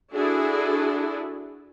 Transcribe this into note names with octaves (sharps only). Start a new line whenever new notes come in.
D4 E4 F#4 G#4 A4